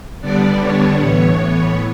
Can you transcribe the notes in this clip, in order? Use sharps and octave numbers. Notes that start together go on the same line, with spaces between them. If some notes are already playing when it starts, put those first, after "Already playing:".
D3 G3 B3 D4 D5
C#5
A2 E3 B3 C#5
C#5